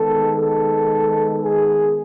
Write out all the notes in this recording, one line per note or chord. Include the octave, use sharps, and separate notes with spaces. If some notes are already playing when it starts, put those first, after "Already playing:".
Already playing: D#3 G#3 B3 A4
A4
G#4